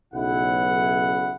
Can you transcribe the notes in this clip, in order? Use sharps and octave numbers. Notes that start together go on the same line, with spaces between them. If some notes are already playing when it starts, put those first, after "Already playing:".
B1 C#3 E4 F#5